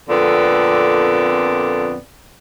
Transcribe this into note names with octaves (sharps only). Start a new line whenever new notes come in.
F2 A#2 D3 B3 C4 D5